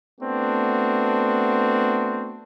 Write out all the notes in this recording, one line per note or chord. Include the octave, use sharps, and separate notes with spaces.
A3 B3 C4 D4 F#4